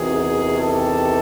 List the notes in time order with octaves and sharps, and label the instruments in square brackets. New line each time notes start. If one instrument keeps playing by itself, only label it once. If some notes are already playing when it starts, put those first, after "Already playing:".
Already playing: [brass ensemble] E2 C3 D#3 F#4 G#4
G4 A4